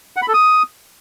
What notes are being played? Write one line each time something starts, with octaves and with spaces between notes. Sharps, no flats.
F#5
B5
A4
D#6